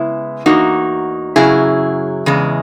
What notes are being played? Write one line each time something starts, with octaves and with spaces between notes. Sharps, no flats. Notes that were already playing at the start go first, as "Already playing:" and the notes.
Already playing: C#3 G#3 B3 E4
E2 D#3 A#3 D#4 F#4
F#2 C#3 F#3 E4 G#4
E2 C#3 G#3